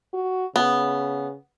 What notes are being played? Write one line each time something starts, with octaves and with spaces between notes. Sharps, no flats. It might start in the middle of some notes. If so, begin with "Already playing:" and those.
F#4
C#3 B3